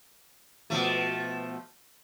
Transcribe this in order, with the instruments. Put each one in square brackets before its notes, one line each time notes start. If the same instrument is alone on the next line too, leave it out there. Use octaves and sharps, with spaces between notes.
[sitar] B2 F3 A3